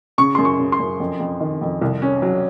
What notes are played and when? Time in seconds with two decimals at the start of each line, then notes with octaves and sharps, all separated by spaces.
0.18 C#3 C#6
0.35 F#2 C6
0.45 C#6
0.59 C#3
0.72 C6
0.79 F#2
1.00 F2
1.20 F2
1.41 D#3
1.61 F2
1.81 C2
2.02 C#4
2.22 F#3